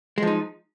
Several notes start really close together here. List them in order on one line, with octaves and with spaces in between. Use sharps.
G#3 F3 D#4